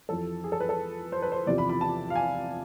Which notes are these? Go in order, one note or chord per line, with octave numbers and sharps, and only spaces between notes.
F2 E3 A4
G#4
A4
B4
A4
C5
B4
C5
E2 C3 F3 D5
B5
B5
A5
F5
G#5